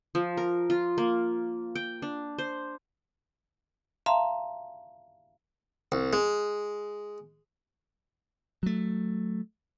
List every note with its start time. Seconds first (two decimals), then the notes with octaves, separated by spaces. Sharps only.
0.15 F3
0.37 A#4
0.70 F4
0.98 A#3
1.75 G5
2.02 D4
2.38 C5
4.06 E5 F5 A5 A#5 C6
5.92 C2
6.13 G#3
8.63 F#3 A3